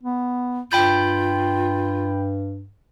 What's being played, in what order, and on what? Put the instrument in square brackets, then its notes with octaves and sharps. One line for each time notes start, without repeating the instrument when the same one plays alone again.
[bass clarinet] B3
[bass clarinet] G2 [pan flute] F4 [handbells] G5 B5 G6